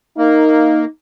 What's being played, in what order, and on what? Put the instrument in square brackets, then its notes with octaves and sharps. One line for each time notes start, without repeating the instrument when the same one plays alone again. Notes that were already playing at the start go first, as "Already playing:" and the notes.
[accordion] A#3 [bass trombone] D#4